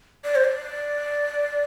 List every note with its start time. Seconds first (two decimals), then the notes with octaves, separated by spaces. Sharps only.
0.24 D5
0.35 C5
0.44 D5